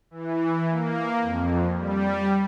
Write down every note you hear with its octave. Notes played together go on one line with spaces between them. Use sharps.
E3
A#3
F2
G3